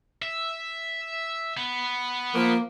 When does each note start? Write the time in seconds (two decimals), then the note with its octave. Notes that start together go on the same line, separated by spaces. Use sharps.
0.22 E5
1.57 B3
2.34 F3 A#3